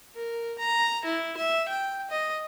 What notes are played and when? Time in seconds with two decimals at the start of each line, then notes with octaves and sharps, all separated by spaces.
0.15 A#4
0.59 A#5
1.05 E4
1.37 E5
1.69 G5
2.10 D#5